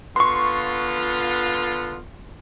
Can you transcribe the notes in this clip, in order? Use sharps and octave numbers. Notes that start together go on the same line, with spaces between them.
D3 B3 F4 C6 C#6